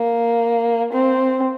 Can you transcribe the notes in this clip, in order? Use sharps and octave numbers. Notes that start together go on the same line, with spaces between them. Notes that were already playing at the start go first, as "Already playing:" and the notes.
Already playing: A#3
C4